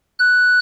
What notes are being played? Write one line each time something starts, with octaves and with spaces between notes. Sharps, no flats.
F#6